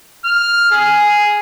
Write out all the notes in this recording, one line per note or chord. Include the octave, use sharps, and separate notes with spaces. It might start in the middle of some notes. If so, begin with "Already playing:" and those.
F6
G#4